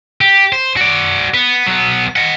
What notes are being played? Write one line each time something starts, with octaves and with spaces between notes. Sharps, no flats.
G4
C5
F#4 D5
B3
F#3 B3
D#5 F#5